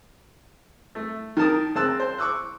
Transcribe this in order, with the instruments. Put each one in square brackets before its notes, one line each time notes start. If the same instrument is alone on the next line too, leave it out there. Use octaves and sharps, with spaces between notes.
[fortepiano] A3
D#3 A#4 A5 D#6
C#3 C4 A5 E6 F#6
C5
C#6 D6 E6 F#6